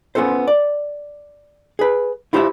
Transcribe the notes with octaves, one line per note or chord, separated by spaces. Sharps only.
B3 C#4 F4 A4 C5
D5
G#4 B4
E4 F4 G4 C5 D5 E5